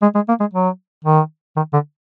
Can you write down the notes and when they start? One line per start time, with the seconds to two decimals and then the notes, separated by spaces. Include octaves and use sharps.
0.02 G#3
0.15 G#3
0.28 A#3
0.40 G#3
0.54 F#3
1.05 D#3
1.56 D#3
1.73 D3